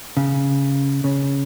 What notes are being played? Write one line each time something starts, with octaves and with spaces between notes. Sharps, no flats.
C#3
C#3